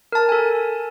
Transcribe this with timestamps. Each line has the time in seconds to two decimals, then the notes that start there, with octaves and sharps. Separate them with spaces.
0.12 A#4 A5
0.29 A4 G#5